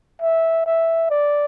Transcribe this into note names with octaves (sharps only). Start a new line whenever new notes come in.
E5
E5
D5